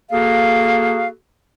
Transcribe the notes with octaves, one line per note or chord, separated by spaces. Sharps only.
A#3 F#4 G#4 A4 F5